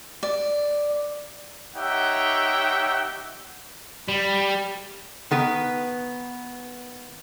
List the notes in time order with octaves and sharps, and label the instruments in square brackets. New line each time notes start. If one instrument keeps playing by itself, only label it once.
[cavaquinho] D5
[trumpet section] D#4 G4 C#5 E5 F#5 G5
[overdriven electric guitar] G3
[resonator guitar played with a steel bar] D#3 B3 B4